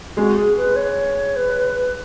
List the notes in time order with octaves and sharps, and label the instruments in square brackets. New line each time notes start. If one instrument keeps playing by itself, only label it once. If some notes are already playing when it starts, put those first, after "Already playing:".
[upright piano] G#3 [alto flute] F#4
[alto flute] G#4
B4
C#5
B4